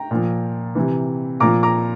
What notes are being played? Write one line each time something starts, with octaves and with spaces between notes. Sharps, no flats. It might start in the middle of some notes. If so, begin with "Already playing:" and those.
Already playing: G5 A#5
A#2 F3
C3 E3
A#2 F3 A#5 D6
A#5 D6